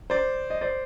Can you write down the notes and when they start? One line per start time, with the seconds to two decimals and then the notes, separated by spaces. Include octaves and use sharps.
0.10 C5 D5
0.50 D#5
0.61 C5 D5